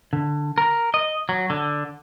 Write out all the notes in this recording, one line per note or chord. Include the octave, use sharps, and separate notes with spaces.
D3
A#4
D#5
F#3
D3